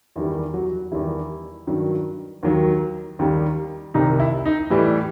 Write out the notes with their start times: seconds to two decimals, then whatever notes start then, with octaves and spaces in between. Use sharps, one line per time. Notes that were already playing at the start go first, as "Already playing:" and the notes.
0.16 E2 D#3 G3 E4
0.54 F#3 F#4
0.92 E2 D#3 G3 E4
1.67 G2 D#3 F#3
2.43 D#2 D#3 F#3
3.19 D#2 D#3 G3
3.94 C2 C3 D#3 D#4
4.20 E4
4.46 D#4
4.70 A2 E3 G3